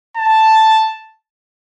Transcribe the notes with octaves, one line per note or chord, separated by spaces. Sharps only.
A5